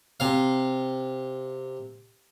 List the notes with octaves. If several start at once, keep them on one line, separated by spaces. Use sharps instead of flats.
C3 F5